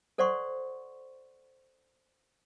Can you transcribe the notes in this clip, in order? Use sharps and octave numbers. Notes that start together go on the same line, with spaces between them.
A4 C5 D5 F#5 C6 C#6